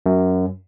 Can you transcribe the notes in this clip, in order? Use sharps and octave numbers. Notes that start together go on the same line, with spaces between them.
F#2